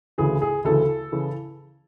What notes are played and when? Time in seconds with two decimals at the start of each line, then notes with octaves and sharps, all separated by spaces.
0.18 D2 C#3 E3 G#4
0.42 G#4
0.64 D2 C#3 E3 A4
1.12 C#3 E3